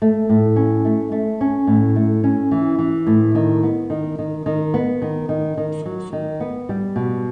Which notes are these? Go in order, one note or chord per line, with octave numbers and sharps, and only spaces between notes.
A3
A2
C#4
A3
A3
C#4
A2
A3
C#4
E3
E3
A2
D#3
B3
D#3
D#3
D#3
B3
D#3
D#3
D#3
F#3
D#3
B3
G3
B2